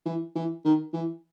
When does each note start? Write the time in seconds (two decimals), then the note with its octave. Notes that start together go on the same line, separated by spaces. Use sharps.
0.06 E3
0.36 E3
0.65 D#3
0.93 E3